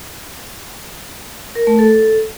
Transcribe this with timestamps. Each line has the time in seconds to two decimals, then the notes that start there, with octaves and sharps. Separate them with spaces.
1.55 A#4
1.67 A3
1.79 A4